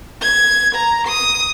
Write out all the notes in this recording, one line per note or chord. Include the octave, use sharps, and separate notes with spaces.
G#6
A#5
D#6